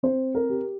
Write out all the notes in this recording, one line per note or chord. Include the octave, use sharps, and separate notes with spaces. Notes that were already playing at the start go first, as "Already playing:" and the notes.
C4 C5
A#4
G4